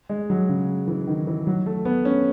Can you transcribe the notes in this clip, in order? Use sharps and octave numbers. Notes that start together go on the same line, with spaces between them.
G#3
F#3
C#3
E3
D#3
E3
F#3
A3
B3
C#4